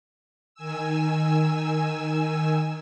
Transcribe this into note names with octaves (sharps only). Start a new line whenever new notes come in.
D#3 G#5 E6